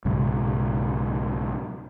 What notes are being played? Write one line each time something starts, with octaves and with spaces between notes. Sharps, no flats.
B1 G#2 C#3